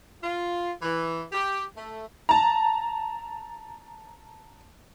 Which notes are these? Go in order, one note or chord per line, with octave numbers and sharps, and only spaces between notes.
F4
E3
G4
A3
A5 A#5